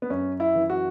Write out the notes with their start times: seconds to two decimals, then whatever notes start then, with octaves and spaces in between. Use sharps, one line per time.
0.02 B3
0.10 F#2 C#4
0.40 E4
0.55 E3
0.70 F#4